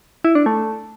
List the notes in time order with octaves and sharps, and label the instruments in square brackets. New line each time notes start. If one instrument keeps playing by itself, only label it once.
[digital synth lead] E4
D4
A3